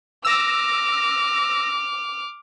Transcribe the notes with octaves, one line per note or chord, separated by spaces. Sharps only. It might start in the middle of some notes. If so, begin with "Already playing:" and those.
D6 E6 F6 A#6